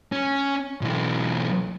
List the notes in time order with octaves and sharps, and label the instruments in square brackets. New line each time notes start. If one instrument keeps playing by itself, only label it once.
[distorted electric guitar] C#4
B1 E3